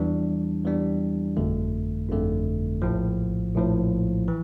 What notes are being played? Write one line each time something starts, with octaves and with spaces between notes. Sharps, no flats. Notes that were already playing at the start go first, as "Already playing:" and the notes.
Already playing: E2 E3 G3 D4
E2 E3 G3 D4
G1 F2 D3 A3
G1 F2 D3 A3
A#1 A2 F3
A#1 A2 F3
E3